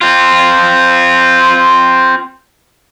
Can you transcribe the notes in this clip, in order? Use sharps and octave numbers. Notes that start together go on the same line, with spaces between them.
C4 F4